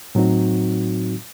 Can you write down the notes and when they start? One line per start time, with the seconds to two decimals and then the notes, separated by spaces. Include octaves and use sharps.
0.15 A2 F#3 C4 D#4 F#4